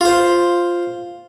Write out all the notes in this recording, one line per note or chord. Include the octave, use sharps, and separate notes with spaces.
F4 C5